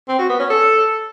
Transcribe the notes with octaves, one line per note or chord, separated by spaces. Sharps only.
C4
F#4
B3
C#4
A4